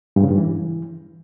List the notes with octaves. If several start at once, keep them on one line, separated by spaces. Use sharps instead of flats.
G2
C#3
G2
E3